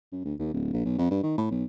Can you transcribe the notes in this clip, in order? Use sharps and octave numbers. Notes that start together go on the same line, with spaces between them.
F#2
D2
D#2
D1
A#1
B1
F2
G2
D#3
A2
B1